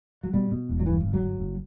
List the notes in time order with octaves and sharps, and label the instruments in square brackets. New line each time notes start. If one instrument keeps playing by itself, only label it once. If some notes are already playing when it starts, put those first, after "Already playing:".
[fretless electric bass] F#3
B2 G3
B2
E1
F#3
G2 E3
G1
F#3
G1
F#1